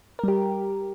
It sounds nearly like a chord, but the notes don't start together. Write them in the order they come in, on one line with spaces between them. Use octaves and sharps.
A#4 G3 G4